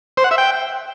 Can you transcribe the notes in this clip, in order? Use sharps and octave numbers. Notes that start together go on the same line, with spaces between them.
C5
F#5
E5
G5